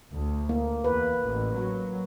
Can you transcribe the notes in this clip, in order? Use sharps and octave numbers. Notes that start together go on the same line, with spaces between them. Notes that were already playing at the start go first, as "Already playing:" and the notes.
D2
A#3
E2 B4
A1
F#3